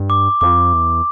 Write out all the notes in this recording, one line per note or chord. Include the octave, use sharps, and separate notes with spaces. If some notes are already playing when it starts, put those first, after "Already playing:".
Already playing: G2
D6
F2 D6
E2